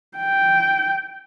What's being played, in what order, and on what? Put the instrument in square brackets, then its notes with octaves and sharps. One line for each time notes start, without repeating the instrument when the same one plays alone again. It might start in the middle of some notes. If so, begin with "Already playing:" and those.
[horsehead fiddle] G5